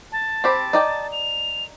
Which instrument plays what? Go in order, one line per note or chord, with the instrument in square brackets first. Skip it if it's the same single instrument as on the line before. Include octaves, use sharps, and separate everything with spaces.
[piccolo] A5
[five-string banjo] C4 G4 B5
D#4 D5 G5
[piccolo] F7